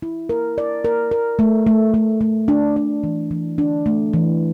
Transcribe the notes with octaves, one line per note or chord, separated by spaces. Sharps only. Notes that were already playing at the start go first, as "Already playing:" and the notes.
E4
A#4
D5
A#4
A#4
A3
A3
A3
A3
D4
D4
E3
E3
D4
A3
E3